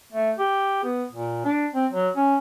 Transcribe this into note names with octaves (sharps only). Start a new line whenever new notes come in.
A3
G4
B3
A#2
D4
C4
F#3
C#4